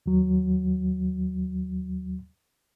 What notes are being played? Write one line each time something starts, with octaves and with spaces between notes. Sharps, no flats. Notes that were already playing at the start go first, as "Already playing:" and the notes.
D#2 F#3